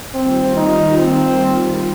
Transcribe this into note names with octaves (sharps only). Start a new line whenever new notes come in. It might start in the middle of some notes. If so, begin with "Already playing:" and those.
D#3 G3 A#3 C4 F4
D#4
C4